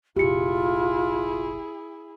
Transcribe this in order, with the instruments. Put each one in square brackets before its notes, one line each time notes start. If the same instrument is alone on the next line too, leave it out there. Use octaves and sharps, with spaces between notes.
[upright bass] F1 A#1 [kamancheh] E4 G#4 [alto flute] F4 [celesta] G4 C#7